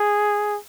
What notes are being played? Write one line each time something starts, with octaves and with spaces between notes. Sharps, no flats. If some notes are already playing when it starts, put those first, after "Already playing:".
Already playing: G#4